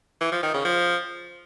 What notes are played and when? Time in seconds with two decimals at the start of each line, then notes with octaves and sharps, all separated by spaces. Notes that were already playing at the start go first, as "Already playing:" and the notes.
0.21 E3
0.32 F3
0.43 D#3
0.54 C#3
0.65 F3